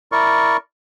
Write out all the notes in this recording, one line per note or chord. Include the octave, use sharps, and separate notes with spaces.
E4 A#4 D5 C#6